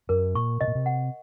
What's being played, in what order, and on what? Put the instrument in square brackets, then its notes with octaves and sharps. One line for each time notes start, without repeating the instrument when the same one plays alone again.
[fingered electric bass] F#2 [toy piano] A#4
[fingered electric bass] A#2 [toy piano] C#6
[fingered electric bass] C3 [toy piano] D#5
[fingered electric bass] A#2
C3
[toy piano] F#5